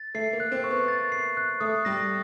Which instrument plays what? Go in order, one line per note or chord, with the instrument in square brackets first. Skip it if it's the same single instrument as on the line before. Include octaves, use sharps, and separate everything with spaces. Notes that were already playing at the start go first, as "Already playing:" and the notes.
Already playing: [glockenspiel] A6
[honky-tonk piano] A3 [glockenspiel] C7
[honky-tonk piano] A#3
[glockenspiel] F#6
[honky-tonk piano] C4
[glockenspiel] C#6
[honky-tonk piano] B3
[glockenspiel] A6
C7
F#6
[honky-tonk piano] A3 [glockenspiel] D#6
[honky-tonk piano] G3 [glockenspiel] A#6